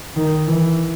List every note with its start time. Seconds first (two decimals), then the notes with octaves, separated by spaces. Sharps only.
0.16 D#3
0.47 E3